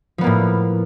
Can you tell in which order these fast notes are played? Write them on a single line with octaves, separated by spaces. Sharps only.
F3 B3 A#3 A2